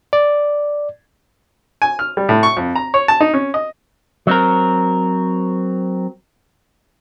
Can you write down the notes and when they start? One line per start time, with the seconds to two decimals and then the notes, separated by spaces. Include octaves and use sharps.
0.13 D5
1.82 G#5
1.99 F6
2.17 G3
2.29 A2
2.43 C#6
2.57 F2
2.76 A#5
2.94 C#5
3.08 A5
3.21 D#4
3.34 C#4
3.54 D#5
4.27 F#3 C4 A#4